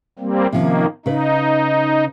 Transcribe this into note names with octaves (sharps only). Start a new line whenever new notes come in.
G3 A#3 C4
C3 D#3 F3 A#3 C#4
C#3 D#4 B4